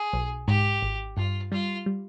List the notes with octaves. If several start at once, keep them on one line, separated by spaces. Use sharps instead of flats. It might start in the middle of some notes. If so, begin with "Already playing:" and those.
Already playing: G#4
B1
G#2 G4
G#1
G2 F4
G3 F4
G3